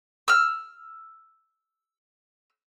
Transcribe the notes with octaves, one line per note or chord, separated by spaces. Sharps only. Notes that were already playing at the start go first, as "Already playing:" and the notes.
E6 F6